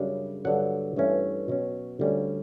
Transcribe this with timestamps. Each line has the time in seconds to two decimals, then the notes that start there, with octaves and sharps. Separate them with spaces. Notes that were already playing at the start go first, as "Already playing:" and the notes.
Already playing: F#2 C#3 G3 D4
0.45 G2 D3 F#3 F#5
0.96 G2 E3 A3 C#4
1.48 B2 F#3 C#4
2.00 D2 D3 G3 C#4